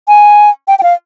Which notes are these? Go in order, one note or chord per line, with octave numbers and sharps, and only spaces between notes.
G#5
G5
G5
F5